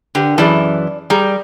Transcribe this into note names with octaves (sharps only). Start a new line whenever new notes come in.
D3 G4 A#4 B4
F#2 E3 G#4 D5 A5
G3 G#4 A#4 A#5